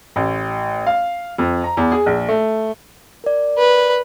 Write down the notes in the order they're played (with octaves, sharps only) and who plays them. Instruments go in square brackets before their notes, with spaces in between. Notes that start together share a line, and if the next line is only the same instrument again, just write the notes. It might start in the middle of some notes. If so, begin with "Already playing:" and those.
[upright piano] A1
F5
F2
A#5
E2
G#4
A#1
A3
[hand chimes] A#4 D5
[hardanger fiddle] B4